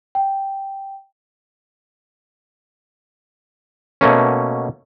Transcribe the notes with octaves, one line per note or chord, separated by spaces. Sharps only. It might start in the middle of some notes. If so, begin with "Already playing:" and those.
G5
B2 A3 A#3 C#4